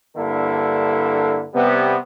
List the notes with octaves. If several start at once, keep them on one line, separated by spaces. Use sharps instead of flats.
G2 D3 A#3 E4 A4
C3 G3 B3